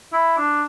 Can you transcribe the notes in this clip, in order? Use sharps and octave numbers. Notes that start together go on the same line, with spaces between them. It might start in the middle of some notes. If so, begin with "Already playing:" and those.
E4
D4